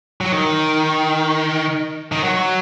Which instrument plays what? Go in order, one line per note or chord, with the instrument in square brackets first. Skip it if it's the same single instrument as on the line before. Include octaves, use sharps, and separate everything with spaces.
[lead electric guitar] F#3
D#3
D#3
F#3